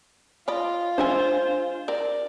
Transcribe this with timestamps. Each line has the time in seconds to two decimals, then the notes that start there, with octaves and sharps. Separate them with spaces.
0.48 F4 D5 D#5 B5
0.98 G#3 D4 C5 E5 G#5
1.88 C4 A#4 D5